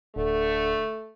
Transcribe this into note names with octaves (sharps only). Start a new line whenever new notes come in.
D1 D3 A3